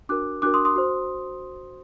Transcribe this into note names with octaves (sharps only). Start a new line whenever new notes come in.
D4 F#4 A#4 D6 F#6
D4 F#4 A#4 D6 F#6
C6 D#6
C6 D#6
F#4 C5